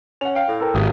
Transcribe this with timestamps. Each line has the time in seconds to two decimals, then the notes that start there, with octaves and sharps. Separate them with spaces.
0.21 C#4 F#5 F7
0.35 F5 G5
0.48 A2
0.60 A4 A#4 G5
0.75 G#1 G4 D#6